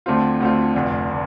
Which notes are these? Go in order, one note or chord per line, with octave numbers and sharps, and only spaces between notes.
D2 D3 A3 C4 F4
D2 D3 A3 C4 F4
F1 F2 D3
D3